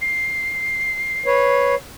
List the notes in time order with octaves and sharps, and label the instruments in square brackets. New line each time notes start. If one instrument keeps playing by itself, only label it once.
[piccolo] C7
[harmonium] B4 C#5